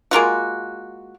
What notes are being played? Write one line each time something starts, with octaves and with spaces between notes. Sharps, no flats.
G#3 A#3 F4 F#4